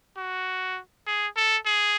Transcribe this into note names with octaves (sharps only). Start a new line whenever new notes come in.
F#4
G#4
A4
G#4